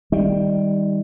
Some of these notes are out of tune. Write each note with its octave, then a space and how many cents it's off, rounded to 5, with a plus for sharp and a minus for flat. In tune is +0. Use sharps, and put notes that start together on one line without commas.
D#3 +10 G3 +15